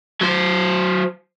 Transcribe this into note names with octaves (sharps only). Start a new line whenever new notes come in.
F#3 C5